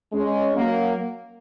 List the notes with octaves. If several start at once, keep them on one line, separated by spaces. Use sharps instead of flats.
G#3 C#4
F#3 A#3